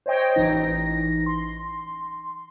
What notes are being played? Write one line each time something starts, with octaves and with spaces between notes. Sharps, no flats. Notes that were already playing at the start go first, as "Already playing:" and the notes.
C5 C#5 D#5 G5
A1 E3 D#4 A#6
C6